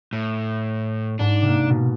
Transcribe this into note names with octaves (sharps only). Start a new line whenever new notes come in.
A2
G#2 D4
C3 A#3
B2